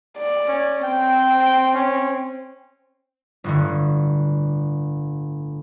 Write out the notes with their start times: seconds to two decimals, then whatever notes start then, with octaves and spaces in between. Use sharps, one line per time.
0.18 D5
0.48 C#4
0.83 C4 G5
1.74 C#4
3.44 G1 A2 D3